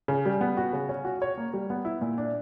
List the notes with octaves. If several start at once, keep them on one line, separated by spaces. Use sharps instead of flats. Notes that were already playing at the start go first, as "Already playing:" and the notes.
C#3
G3
B3
F#4
C#3
C#4
F#4
C#5
A#3
G3
B3
E4
A#2
D4